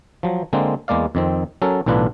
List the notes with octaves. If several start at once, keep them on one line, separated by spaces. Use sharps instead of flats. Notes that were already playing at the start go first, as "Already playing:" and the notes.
F3 F#3
D3 G#3 A#3 C4
E2 G#3 A#3 D5 F5
F2 D#3 C4
F#3 C#4 A4 A#4
B1 A2 E3 D4 F4 B4